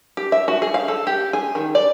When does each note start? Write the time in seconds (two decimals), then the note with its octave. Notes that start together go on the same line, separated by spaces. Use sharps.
0.17 G4
0.32 E5
0.48 F#4
0.62 G#4
0.74 F5
0.88 A4
1.07 G4
1.33 G#4
1.55 D#3
1.75 D5